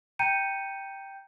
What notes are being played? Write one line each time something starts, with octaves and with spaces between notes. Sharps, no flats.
G5 A#5 G6 C#7 D#7